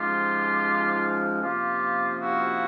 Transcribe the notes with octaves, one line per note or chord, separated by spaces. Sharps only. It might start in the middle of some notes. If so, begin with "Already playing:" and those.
Already playing: G#2 F3 G#3 C#4 F4 G4
C3 F3 A#3 C#4 F4 G4
E4 F#4